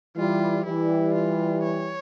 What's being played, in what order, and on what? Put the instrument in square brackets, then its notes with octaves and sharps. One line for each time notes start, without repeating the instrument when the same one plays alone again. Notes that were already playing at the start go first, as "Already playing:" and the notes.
[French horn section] E3 G3 [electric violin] F4
[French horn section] E3 G3 [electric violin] E4
[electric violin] F4
C#5